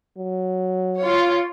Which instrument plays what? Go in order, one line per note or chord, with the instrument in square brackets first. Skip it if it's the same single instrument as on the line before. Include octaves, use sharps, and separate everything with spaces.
[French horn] F#3
[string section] F4 C#5